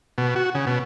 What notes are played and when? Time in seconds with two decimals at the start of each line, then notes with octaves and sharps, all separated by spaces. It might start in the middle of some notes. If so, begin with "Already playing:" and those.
0.18 B2
0.36 F#4
0.55 C#3
0.67 B2